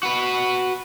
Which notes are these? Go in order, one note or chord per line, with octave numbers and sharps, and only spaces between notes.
F#4 B4